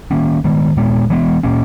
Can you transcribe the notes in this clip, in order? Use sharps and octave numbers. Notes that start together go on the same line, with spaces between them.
D#3 A#3 C#4
D#3 G#3 B3
A#2 G#3 B3
E3 G#3 B3
A#2 A#3 C#4